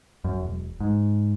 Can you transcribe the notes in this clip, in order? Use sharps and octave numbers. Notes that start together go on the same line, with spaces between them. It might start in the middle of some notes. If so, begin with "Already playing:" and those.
F#2
E1
G#2